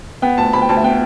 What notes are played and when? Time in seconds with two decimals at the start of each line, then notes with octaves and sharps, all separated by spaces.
0.22 B3 G5
0.38 D2 A5
0.53 D2 B5
0.62 G5
0.69 D2 A5
0.77 E5
0.84 B3 G5